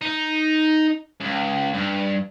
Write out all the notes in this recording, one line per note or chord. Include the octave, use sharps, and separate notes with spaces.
D#4
C#2
G2